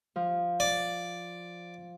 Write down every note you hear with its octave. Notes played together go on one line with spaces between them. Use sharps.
F3
D5